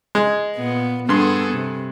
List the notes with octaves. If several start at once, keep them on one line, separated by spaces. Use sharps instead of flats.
G#3
A#2 B3
G2 B3 G#4 A4 C6
C3